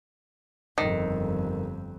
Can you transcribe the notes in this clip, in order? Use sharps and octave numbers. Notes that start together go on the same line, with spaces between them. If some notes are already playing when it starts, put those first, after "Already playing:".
G1 F2 D#3